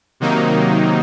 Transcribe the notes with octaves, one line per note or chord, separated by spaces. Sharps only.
C3 D#3 F#3 A#3 D#4